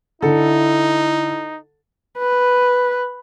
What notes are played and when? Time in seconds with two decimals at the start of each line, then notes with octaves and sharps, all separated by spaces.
0.22 D3 D#4 E4 A4
2.19 B4